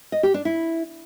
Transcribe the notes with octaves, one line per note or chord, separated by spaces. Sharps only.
D#5
G4
D4
E4